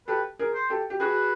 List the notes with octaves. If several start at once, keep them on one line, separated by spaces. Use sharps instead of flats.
G4 A4 B4
G#4 A#4
C5
G4 A4
G4
F#4 G#4 B4